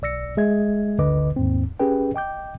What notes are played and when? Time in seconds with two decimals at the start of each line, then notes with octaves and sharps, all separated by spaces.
0.02 B1 D5 E6 A#6 C#7
0.37 G#3 G#4 D#5 E5 G#6
0.99 G1 D2 D3 B4 D#5 D6
1.36 D#2 G#2 C4
1.79 C#4 G4 G#4 B4 G5
2.14 D#5 G5 D6 G6